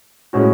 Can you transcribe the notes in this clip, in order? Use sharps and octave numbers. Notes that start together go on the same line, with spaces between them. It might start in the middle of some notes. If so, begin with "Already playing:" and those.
A2 G#3 C#4 F#4